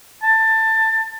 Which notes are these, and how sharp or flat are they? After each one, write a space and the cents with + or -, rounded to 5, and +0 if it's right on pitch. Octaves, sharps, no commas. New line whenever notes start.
A5 +20